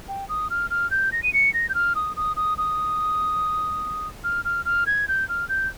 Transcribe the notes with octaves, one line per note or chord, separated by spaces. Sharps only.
G5
D#6
F6
F6
G6
A#6
D#7
C#7
A#6
G6
F6
D#6
D#6
D#6
D#6
F6
F6
F6
G#6
G6
F6
G6